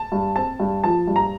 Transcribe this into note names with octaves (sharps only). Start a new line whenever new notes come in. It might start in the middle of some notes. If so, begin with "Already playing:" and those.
Already playing: A5
G2
C4 A5
G2
F3 A5
G2
A#5